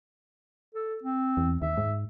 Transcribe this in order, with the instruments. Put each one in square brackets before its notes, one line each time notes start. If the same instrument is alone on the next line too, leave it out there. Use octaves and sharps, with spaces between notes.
[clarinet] A4
C4
[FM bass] E2
[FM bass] D#2 [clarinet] E5
[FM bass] G#2